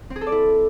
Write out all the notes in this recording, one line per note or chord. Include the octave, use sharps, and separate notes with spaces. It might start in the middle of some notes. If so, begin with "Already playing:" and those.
C4
G#4
A4
D5
E4